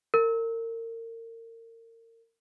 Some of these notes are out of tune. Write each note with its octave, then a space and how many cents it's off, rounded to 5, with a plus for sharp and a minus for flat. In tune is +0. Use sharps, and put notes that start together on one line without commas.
A#4 -35